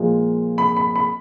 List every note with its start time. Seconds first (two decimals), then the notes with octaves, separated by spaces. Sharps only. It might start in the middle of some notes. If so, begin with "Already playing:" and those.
Already playing: A#2 F3 G#3
0.58 B5
0.77 B5
0.96 B5